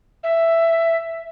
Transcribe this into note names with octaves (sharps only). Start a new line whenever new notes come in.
E5